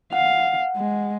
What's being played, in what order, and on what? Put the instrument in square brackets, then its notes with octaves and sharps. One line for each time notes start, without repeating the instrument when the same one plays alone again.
[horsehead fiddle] F5 [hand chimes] F#5
[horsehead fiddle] G#3